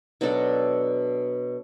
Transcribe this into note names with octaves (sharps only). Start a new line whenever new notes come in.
B2 F#3 D4 A4